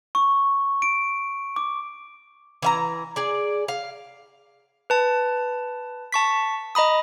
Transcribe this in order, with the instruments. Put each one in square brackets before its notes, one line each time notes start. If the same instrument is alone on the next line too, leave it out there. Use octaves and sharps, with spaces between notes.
[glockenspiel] C#6
D7
D6
[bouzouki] E3 E5 A#5
G#4 D5
F5
[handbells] B4 A5
A5 C#6 B6
D#5 A#5 B5 D#6